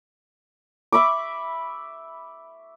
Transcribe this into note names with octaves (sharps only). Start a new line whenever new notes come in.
E5 B5 C#6 D6